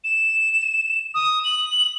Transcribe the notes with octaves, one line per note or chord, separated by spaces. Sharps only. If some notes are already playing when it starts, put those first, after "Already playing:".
E7
D#6
F#7